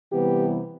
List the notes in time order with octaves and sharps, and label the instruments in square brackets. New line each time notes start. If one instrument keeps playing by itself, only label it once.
[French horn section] C3 E3 G3 B3 G4